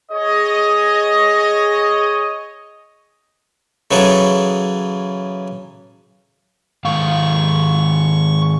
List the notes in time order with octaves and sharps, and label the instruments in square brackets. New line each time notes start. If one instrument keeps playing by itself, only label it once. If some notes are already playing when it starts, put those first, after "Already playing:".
[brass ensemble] G#4 C#5 D#5
[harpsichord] C#3 E3 F#3 G#4 A4
[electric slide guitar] G#2 D#3 F5 [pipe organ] C#6